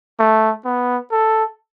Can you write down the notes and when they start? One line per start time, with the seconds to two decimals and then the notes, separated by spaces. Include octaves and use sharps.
0.19 A3
0.65 B3
1.11 A4